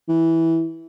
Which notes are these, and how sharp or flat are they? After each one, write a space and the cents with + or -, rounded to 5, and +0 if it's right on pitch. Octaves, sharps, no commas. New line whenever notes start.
E3 -10